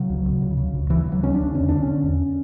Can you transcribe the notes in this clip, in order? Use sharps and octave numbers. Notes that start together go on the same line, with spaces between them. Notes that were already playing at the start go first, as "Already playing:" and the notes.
Already playing: C#3 F#3
D2
D2
C#3
C#3
D2
D2 E3
C#3
F#3
C#3 C#4
D4
D2
E2 C#4
D3 D4
D3 C#4
E2